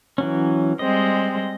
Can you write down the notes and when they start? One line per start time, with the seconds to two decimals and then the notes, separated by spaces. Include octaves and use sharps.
0.18 E3 F#3 C#4
0.79 G3 G#3 C4 D#5